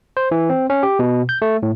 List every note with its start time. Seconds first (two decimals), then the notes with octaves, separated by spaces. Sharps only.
0.17 C5
0.31 E3
0.50 C4
0.70 C#4
0.83 G4
0.99 B2
1.29 G6
1.42 A3
1.63 A2